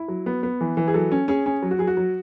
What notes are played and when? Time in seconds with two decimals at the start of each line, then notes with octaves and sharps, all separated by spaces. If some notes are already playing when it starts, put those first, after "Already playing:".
Already playing: E4
0.08 F#3
0.26 B3
0.43 B3
0.61 E3
0.77 E3
0.88 G#4
0.94 F#3 A4
1.12 C#4
1.28 C#4 G#4
1.46 C#4
1.62 F#3
1.71 F#4
1.79 F#3 G#4
1.87 F#4
1.97 F#3